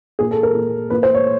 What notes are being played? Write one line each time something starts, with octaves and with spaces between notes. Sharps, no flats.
A#2 G#4
A4
A#4
A#2
A#2 B4
C5
C#5